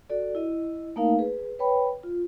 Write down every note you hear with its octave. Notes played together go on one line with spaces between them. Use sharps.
F#4 A4 D5
E4 D#5
A3 A#3 D#4 A#4 F5
G#4 B4
B4 C#5 G5 B5
F4